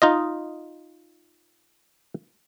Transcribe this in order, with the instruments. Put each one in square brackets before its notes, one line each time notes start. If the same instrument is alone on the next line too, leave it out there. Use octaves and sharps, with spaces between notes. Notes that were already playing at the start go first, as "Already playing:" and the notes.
[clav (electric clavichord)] D#4 F4 D#5